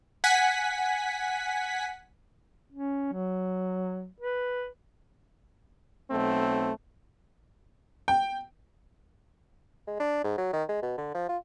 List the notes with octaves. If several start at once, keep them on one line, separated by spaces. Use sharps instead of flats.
F#5 G#5 B6
C#4
F#3
B4
B1 A3 C4
G5
G#3
D4
G#2
F#3
D#3
G#3
B2
D3
F3
F4